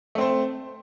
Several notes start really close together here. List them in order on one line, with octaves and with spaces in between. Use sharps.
A3 C4 C5